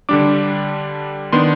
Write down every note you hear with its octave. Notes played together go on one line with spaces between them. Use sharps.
D3 G3 D4 D6
D#3 B3 D4 C6